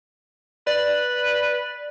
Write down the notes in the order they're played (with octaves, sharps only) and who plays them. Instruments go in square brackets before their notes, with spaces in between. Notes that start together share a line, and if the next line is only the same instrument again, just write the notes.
[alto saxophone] B4 [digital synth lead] D5